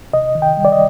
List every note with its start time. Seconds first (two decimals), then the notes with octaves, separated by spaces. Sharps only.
0.13 C3 D#5
0.35 D#3
0.42 G5
0.57 G3
0.65 D5
0.72 D#5